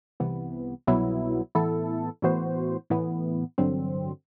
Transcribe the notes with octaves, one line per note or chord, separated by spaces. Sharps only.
C2 C3 E3 B3
C2 B2 F#3 B3 E4
A2 E3 B3 E4 A4
A2 E3 B3 F#4 C5
A2 E3 B3
A1 G2 D3 F#3 C4